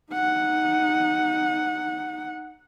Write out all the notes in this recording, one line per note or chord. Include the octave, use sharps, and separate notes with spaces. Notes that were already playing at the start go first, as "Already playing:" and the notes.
D#4 F#5